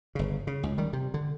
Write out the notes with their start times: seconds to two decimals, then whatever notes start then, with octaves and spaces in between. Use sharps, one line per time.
0.15 G1 C#3
0.47 C#3
0.63 C#2
0.78 D#3 G3
0.93 C3
1.14 D3